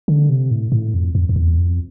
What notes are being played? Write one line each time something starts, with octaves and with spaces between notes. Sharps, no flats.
D3
C3
A2
A2
F2
F2
F2
E2
F2